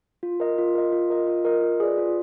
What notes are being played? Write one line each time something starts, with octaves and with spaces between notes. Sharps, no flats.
F4
A#4 D#5
F4
A#4 D#5
F4
A#4 D#5
F4
A#4 D#5
F4
G#4 B4 D5
F4